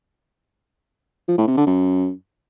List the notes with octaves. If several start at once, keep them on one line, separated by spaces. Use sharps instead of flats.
F3
A2
C3
D3
F#2